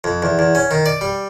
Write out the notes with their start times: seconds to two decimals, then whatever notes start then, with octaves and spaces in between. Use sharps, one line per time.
0.04 F2
0.23 E2
0.39 E2
0.55 C#4
0.71 D#3
0.86 D5
1.01 G3